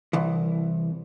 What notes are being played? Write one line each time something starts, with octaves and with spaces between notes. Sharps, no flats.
C2 E3